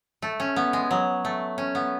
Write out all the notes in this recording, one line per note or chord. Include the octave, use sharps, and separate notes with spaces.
A3
C#4
B3
G#3
F#3
A3
C#4
B3